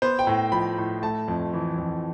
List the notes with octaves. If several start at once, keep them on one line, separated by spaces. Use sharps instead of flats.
B3 C5
G5
A2
F3 B5
A2
A3 A5
F2
E3
F2